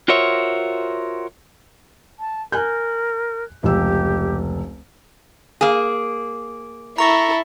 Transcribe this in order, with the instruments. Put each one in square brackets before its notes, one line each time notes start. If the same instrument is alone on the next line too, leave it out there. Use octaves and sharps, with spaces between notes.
[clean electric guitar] F4 F#4 A#4 C5 C#5 E5
[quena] A5
[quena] A#4 [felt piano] G#5 F#6 G6
[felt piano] F1 C#2 E6 [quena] G4
[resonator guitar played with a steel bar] A#3 G#4
[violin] E4 A4 [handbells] A#5 C#6 A#6